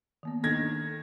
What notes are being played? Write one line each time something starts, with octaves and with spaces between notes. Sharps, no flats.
D#3 A#3 B3
D#3 D4 A4 G#6 A#6